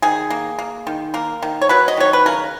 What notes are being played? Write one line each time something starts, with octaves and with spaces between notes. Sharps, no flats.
D#3 G#4
A#3
A#3
D#3
A#3 A#4
D#3
C#5
F#3 B4
D#5
D#3 C#5
B4
C#3 A#4